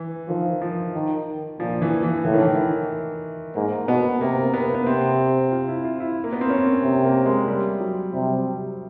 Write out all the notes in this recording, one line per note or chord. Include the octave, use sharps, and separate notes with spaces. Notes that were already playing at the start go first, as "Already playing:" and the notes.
Already playing: E3
D#3 F3
F3
D#3
A#2 F3
E3
E3
A2 E3
D#3
E3
G#2 A#3
B2 B3
C3 A#3
B3
B3
C3 C4
F4
E4
F4
E4
A#3
B3
C4
C#4
C3
A#3
G#3
G3
F#3
C3 G3